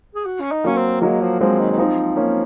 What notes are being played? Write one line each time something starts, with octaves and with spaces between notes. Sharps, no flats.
G#4
F#4
C#4
D#4
F#3 A#3 C#4
C4
F#3 G#3 A#3
F3
F3 G#3 C4
D#3
D#3
F3 C4 D#4
A#3 C#4